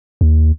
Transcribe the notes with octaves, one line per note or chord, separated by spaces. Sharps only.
D#2